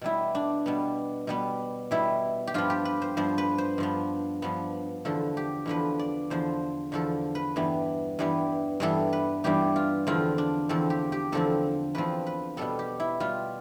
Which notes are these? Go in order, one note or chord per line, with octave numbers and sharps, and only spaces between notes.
B2 G3 B3 E4
D4
B2 G3 B3
B2 G3 B3
B2 G3 B3 E4
G4
G2 F3 B3 F4
G4
B4
C5
G2 F3 B3 C5
B4
C5
G2 F3 B3
G2 F3 B3
E2 D3 F3 A4
G4
E2 D3 F3 B4
D5
E2 D3 F3 C5
E2 D3 F3 A4
B4
G2 E3 G3 B3
G2 E3 G3 B3
G2 E3 G3 B3 A4
B4
G2 E3 G3 B3 G4
F4
E2 D3 F3 C4 F4
D4
E2 D3 F3 C4 A4
G4
G4
E2 D3 F3 C4 A4
E2 D3 F3 C4 B4
B4
B2 G3 B3 A4
G4
E4
B2 G3 B3 F4